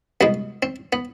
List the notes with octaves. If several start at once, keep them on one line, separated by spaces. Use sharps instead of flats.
C2 B2 G#3 B3
C4
B3